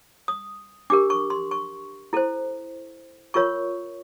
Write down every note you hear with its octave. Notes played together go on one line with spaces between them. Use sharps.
D#6
D4 G4 A#4 D6
C#6
C6
C#6
E4 A4 C5
F4 A#4 C#5 C#6